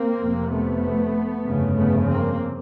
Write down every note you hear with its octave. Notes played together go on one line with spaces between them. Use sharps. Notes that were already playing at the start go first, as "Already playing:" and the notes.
Already playing: A#3 C4
F1 F2 C3
A3 B3
G1 F2 C#3
A3 B3
A#3 C4